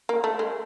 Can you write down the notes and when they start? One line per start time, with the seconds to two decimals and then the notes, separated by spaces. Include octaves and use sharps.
0.09 A#3
0.24 A3
0.39 G#3